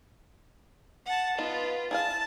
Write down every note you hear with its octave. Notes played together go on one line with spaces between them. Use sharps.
F#5 A5
B3 D#4 F4 B4
E4 G#4 F5 A5